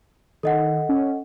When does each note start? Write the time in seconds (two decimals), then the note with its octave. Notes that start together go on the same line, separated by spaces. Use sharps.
0.43 D#3 A4 D#5 F#5
0.89 C#4